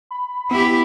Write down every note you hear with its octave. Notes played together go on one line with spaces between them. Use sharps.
B5
B3 E4 G4